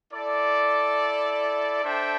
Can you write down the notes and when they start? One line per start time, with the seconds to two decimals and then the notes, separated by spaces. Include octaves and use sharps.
0.12 E4 A4 D5
1.83 D4 A4 C5 E5 G5